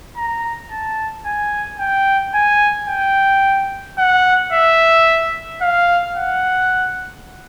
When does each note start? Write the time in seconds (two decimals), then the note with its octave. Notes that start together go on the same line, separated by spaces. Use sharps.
0.17 A#5
0.71 A5
1.25 G#5
1.80 G5
2.34 G#5
2.88 G5
3.98 F#5
4.53 E5
5.61 F5
6.16 F#5